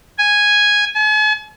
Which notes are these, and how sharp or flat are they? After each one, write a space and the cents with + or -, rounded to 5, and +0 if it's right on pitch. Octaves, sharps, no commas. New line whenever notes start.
G#5 -5
G#5 +45